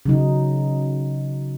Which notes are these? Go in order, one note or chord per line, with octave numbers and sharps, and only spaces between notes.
C#3 F#3 D#4